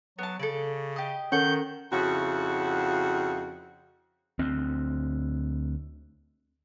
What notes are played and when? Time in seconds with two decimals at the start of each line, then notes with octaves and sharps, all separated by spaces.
0.19 F#3 B3 A5
0.40 C#3 A4 D5
0.96 G4 D#5
1.32 D#3 C#4 A4 A#4 F#5 C#6 G6
1.92 F2 C#3 E4 F#4
4.39 D2 C4